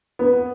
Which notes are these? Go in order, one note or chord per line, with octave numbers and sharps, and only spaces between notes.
B3